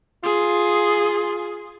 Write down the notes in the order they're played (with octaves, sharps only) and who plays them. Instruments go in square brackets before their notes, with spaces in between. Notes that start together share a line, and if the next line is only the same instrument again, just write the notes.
[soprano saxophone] F4 [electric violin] G#4